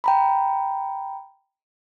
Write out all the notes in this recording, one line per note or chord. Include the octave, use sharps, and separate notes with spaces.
G5 A#5 B5